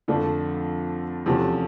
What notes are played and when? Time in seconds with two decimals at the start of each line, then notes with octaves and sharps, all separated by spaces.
0.08 F2 D3 F3 A3 D4
1.26 E2 C3 F3 A3 C#4